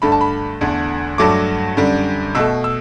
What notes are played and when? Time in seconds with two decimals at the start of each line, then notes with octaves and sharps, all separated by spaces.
0.02 G2 D3 A3 B5
0.12 A5
0.21 B5
0.61 E2 D3 A3
1.18 G2 F#3 A3 D6
1.77 F#2 D3 G3
2.35 B2 A3 E6
2.64 E6